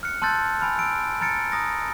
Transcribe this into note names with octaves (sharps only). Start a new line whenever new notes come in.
F6 F#6 C#7
A5 C6 E6 F#6 G6 A6
G#5 B5 F6
E6 D7
A#5 F6 A6 C#7 D7
A#5 D#6 A#6